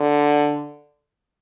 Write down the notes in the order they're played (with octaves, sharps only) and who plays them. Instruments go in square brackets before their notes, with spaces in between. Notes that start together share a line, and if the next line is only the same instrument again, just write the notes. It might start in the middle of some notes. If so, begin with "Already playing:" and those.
Already playing: [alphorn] D3